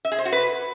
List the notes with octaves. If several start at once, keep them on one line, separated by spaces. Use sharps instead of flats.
E5
G#4
C5
F#4
B4